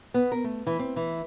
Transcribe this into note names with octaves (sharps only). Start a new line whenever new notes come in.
B3
A#4
A3
E3
C4
E3